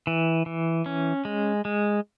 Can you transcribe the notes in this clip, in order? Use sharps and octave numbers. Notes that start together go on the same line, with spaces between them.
E3
E3
C#4
G#3
G#3